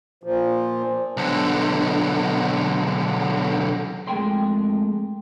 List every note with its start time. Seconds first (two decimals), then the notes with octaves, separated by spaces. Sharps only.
0.24 A#2 F3
1.17 B1 D3
4.08 F2 G#3 A3 A#4 G5 C6